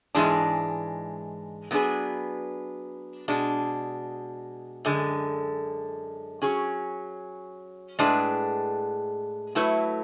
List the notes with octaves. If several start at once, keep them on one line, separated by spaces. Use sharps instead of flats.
G#2 E3 G#3 D4
F#3 B3 D4 G#4 B4
B2 G#3 D4
F#2 D3 G#3
F#3 C#4 G#4
A2 G#3 D4 G#4 B4
F#3 A3 E4 B4